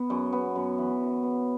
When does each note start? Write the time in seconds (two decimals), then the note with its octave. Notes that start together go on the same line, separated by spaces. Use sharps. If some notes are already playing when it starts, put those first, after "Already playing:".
Already playing: B3
0.10 F#2
0.32 B3
0.55 F#2
0.78 E3
1.00 F#2
1.23 B3